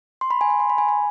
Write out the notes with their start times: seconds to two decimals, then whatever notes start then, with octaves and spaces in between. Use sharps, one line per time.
0.21 C6
0.31 B5
0.41 G#5
0.50 B5
0.60 C6
0.70 B5
0.78 G#5
0.89 G#5